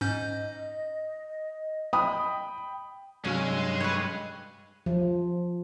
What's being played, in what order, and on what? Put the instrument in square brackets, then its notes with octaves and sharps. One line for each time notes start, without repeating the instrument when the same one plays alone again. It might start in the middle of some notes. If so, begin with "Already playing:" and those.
[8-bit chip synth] G#2 C#4 G6 [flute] D#5
[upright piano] G5 B5 [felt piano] D#6
[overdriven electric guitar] G2 F5 [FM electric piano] C3 F#3 E6 [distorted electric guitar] G#3 [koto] C#4
[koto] B4 C#5
[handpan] F3